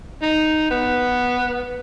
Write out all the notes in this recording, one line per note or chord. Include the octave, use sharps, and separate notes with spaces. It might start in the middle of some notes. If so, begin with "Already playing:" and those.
D#4
B3